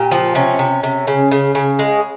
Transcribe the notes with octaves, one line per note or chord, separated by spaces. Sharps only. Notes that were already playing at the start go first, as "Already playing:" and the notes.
Already playing: A#2 G4
F3
C3 C#4
C3
C3
C#3
C#3
C#3
G#3